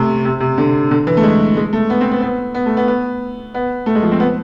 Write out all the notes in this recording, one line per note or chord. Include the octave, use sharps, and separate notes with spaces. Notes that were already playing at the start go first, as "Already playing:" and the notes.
Already playing: C3 A3
C3
C3
D3
D3
E3
A3
G#3
G#3
A3
B3
C4
B3
B3
B3
A3
B3
B3
B3
A3
G#3
F3
C4
B3